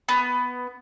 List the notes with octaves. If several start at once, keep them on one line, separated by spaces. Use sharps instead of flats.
B3